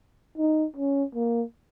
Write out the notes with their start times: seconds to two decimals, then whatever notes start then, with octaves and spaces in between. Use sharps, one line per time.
0.38 D#4
0.77 C#4
1.15 A#3